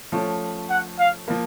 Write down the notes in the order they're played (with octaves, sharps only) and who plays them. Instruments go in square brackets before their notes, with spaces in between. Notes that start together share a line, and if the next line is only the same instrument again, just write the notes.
[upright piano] F3 A3 C#4
[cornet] F#5
F5
[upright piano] F3 A#3